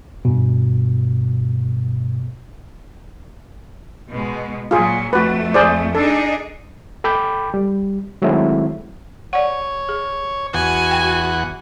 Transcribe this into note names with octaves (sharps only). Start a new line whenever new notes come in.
G2 B2
B2 G#3
A#2 F#3 F4 G#4
F2 A3 F#4 B4
G#4 C5 D5
D4 D#4 G#4 A4
A4 G5 B5 D6 G6
G3
D#3 F#3 G#3 A3 C4 E4
C#5 D5 F#5
G#4
E2 F#4 F#5 G#5
G5